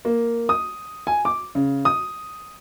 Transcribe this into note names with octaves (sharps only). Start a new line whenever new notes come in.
A#3
D#6
G#5
D6
C#3
D#6